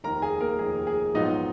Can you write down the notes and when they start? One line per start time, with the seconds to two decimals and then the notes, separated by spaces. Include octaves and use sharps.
0.04 F1 D#2 D#3 A#4 A#5
0.22 G#4 G#5
0.41 A#3 A#4
0.59 F1 D#2 D#3 G#4
0.87 G#4
1.14 A#1 G#2 F#3 B3 D#4 F4 D#5